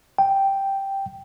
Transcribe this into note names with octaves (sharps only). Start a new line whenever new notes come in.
G5